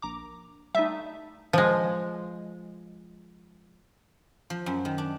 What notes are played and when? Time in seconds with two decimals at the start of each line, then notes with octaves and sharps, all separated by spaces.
0.02 A#1 A#5 D6
0.75 G3 A3 D#4 E5
1.53 F3 G#3
4.50 F3
4.66 F#2
4.85 D#3
4.98 D4